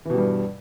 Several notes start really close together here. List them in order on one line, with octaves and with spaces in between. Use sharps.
E3 B2 G3 G2